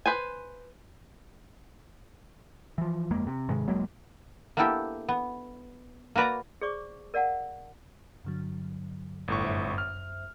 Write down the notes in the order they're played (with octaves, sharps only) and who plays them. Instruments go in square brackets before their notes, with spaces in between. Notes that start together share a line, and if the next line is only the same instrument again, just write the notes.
[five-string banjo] B4 C5 G#5
[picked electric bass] E3 F3
G1 F2 G#3 A#3
C3
G#2 C3 D#3 G#3
E1 F#3 G#3 A#3
[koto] A#3 B3 D4 E4 G4 A4
B3
A#3 F#4 B4 D5 A#5
[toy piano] G#4 C5 D5 C#6 D6
A#4 D5 F5 F#5 A5
[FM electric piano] G2 D3 F#3
[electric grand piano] G1 A2 C#6
[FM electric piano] F#2 C5 E5
[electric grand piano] F6